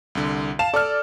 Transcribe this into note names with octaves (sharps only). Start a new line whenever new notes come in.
C2 D3
F5 A5 E7
A4 D5 F6